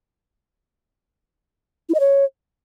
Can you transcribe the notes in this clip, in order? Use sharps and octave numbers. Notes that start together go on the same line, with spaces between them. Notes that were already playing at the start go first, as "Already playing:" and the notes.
E4
D#5
C#5